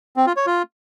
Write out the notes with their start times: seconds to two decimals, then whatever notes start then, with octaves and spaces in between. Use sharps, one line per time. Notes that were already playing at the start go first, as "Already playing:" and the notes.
0.17 C4
0.27 F4
0.36 C#5
0.46 F4